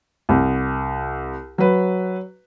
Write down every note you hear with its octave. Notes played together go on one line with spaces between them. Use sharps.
C2
F#3 B4